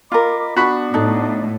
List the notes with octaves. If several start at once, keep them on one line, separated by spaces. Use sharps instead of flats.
F4 A#4 D#5 B5 D6
B3 D4 F#4 B5
A2 D#4 A4